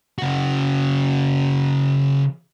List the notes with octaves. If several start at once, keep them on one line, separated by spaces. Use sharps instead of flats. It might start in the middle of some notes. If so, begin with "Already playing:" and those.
C#3 F#4